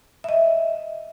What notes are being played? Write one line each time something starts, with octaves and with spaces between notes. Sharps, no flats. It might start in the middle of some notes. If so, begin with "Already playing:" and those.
D#5 E5